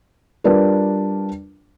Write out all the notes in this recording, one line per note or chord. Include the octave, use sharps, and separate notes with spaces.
G3 D4 F4 A#4 B4